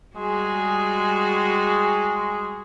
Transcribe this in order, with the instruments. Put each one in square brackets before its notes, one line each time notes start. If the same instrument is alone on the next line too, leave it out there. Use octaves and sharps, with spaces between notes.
[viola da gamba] G3 F#4 G#4 [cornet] G#3